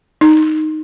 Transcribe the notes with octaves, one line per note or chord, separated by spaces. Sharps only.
D#4